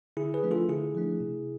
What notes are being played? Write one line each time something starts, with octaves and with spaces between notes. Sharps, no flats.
D3 E4 G#4
G#4 B4
F3 A3 D4
F4 A4
D3 E4 G#4
F3 A3 D4
C3